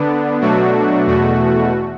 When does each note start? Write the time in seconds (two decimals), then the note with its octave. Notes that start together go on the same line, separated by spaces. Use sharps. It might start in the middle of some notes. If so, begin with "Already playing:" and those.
Already playing: D3 B3 D4
0.41 B2 F#3 A3 D4 F#4
1.06 E2 B2 A3 F#4